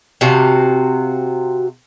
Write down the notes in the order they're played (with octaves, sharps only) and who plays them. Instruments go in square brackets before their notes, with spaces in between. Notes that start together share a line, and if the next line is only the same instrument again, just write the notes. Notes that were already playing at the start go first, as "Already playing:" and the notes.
[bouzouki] C3 F#4 F5 A5